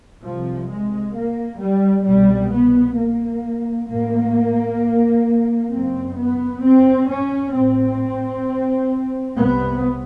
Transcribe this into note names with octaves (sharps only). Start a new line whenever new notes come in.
C2 C3 F3
G#3
A#3
G3
C2 B2 G3
B3
A#3
A1 A2 A#3
F#1 F#2 C#3 C4
B3
C4
C#4
A1 A2 C4
C2 C3 B3